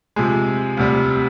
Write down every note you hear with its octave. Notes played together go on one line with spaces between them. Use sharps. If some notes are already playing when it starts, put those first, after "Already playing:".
C3 F3 G#3
D2 C3 G3